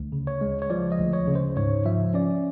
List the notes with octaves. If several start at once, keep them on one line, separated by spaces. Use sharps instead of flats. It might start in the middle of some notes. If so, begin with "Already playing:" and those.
Already playing: D2
C#3
C#5
G#3
C#5
F3 D5
D#5
D2
C#5
C#3
C5
G#2 C#5
F3 E5
C#4 D5